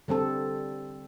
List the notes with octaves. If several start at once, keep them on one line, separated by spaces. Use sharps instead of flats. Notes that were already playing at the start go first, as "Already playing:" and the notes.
D3 G3 C4 A4